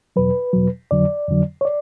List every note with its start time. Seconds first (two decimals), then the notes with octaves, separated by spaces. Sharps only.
0.16 E2 B2 F#3 B4
0.53 E2 B2 F#3
0.91 F2 D3 F#3 D5
1.28 F2 D3 F#3
1.61 C#5
1.65 D5